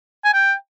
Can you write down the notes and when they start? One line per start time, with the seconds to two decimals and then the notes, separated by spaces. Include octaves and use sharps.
0.24 G#5
0.34 G5